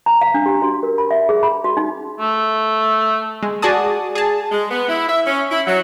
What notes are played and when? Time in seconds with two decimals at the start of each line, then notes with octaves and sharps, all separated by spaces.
0.06 A#5
0.21 F5
0.34 D4
0.46 G4
0.62 F#4
0.83 A#4
0.98 B5
1.11 E5
1.29 G#4
1.43 B5
1.64 F#4
1.77 D#4
2.20 A3
3.43 G#3
3.62 F#4 G#4 D5 A5 D#6
4.15 G#4 A5
4.52 G#3
4.70 B3
4.89 E4
5.07 E5
5.27 C#4
5.51 E4
5.66 F#3